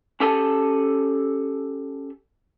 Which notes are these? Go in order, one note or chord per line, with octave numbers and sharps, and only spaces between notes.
C#4 G4 A4 G#5 A5